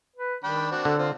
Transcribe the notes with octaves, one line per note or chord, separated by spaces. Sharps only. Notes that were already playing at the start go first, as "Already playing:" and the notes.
B4
D#3 D4 G5 B5
C4 D4 F#4
D3 A4
C4 F4